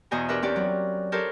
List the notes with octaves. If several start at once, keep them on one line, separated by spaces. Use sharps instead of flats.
E2 B2 C5 G#5 A#5
D4 G4 A#4 B4 E5
C4 C#4 G4 D5
F#3
G4 A4 A#4 C5 C#5